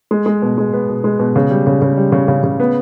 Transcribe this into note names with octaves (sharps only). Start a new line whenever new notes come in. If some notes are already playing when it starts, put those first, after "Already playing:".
G#3
G#3
B2
G#3
B3
B2
G#3
B2
C#3
G3
C#3
C#3
G3
C#3
C#3
C#3
B3